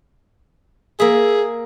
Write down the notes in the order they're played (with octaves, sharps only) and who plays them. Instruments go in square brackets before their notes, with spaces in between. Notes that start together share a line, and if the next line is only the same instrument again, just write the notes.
[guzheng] A#3 E5 [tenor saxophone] G#4